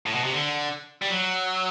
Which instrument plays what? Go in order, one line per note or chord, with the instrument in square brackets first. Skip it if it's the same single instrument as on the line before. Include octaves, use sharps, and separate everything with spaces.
[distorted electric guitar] A2
B2
C3
D3
G3
F#3